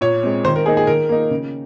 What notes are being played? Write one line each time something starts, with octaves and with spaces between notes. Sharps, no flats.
A#2 C#5
G#3 C4
D#3 C5
A#4
A#3 D#4 G#4
G#4
D#3 A#4
A#3 D#4
C#3